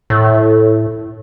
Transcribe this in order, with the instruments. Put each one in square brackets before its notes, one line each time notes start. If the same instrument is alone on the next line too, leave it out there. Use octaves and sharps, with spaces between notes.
[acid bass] A2